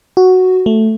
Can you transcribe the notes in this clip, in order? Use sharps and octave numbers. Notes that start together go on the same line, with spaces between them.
F#4
A3